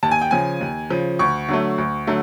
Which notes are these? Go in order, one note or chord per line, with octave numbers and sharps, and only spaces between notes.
D#2 A5
G#5
G5
C#3 F3 G#5
D#2
C#3 F3
D2 C#6
D3 F#3 A3
D2
D3 F#3 A3